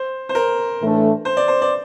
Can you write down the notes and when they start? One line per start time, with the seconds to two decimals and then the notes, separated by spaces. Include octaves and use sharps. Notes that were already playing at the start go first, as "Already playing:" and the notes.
Already playing: C5
0.29 C5
0.35 A#4
0.80 A2 E3 A3 D4
1.25 C5
1.37 D5
1.48 C5
1.62 D5